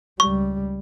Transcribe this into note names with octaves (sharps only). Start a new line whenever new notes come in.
C#2 G3 C#6